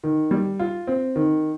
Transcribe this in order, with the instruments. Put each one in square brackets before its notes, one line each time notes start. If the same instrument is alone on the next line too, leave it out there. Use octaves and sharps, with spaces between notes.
[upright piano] D#3
G3
F4
C4
D#3